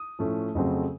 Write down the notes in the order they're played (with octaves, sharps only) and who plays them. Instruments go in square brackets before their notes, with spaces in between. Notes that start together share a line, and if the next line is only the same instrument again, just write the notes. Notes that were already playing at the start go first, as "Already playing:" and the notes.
Already playing: [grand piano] D#6
A2 F3 A3 C#4
F2 C#3 F#3 A3 C4